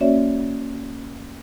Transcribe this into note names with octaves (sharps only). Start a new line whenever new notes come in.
A#3 C#4 F#4 C#5 D5 E5